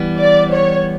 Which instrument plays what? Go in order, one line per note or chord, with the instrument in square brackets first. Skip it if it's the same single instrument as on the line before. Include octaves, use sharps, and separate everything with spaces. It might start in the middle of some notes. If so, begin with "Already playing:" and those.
Already playing: [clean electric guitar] E3 G3 B3
[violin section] D5
C#5